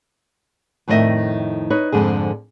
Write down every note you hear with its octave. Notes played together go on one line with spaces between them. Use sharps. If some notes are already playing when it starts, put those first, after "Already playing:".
F2 A2 D#3 C#4 D#5 E5
D#4 B4 C#5
F2 G#2 D3 G#4